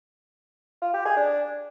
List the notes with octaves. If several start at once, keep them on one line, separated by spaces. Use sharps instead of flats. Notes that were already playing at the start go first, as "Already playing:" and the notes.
F4
G4
G#4
D4